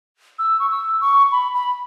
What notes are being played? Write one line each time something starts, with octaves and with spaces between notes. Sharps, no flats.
E6
C#6
E6
C#6
B5
B5